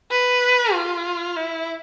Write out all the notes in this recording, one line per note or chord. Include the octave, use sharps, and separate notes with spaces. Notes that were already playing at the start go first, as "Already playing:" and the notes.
B4
F4
E4